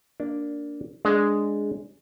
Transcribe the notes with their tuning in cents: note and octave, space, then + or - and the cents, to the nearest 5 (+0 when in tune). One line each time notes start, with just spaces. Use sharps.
A#3 +0 D4 -10
G#3 +0 D4 +0